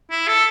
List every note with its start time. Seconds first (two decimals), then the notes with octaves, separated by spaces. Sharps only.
0.11 E4
0.27 A4